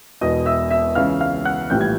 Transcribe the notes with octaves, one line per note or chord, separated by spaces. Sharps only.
E1 E2 B2 D#5 D#6
E5 E6
E5 E6
C#2 C#3 E3 F5 F6
F5 F6
F#5 F#6
A#1 A2 E3 G3 G5 G6
G#6